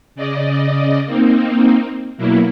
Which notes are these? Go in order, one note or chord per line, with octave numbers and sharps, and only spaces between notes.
C#3 D5 D#5
A#3 C4 D#4
B2 F#3 A#3 E4